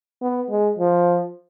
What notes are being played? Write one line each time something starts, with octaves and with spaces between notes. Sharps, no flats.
B3
G#3
F3